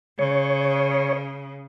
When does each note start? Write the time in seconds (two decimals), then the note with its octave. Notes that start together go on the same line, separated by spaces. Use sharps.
0.19 C#3 C#5